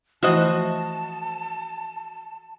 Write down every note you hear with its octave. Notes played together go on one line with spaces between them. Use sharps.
E3 F3 A3 E4 F#4 C5 D#5 A5